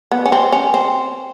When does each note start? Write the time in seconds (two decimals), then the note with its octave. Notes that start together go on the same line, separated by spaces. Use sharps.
0.11 B3
0.26 C#4
0.32 C4
0.52 C#4
0.74 C4